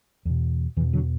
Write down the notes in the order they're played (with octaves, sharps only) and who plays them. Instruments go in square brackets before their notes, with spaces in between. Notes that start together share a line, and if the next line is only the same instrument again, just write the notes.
[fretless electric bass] E2 B2
E2 E3
B2
D3 F#3